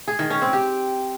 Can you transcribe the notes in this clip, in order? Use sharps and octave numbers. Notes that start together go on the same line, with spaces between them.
G#4
D#3
C#4
C4
G4